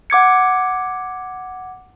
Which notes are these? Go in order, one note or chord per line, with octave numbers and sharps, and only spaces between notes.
F#5 D6 G#6 C#7